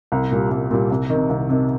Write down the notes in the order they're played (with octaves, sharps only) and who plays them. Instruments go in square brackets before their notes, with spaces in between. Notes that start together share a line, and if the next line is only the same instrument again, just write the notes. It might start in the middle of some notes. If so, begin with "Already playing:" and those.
[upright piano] C2
A#2 G3
C2
A#2 G3
C2
C3 D#3
C2
C3 D#3